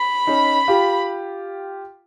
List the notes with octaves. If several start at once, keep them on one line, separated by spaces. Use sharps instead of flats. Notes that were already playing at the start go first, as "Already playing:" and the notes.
Already playing: B5
C#4 D#4
F4 G4